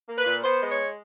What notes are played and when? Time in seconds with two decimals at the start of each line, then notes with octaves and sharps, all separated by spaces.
0.09 A#3
0.17 B4
0.26 A#2
0.44 B3 C5
0.62 G#3
0.70 C#5